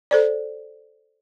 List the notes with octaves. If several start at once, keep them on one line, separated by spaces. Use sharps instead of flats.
A4 C5 D5